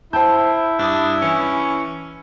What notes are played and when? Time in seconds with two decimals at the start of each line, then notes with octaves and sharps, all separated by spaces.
0.13 E4 C5 G5 A5 G6
0.79 G2 D4 D#6
1.22 E3 C#4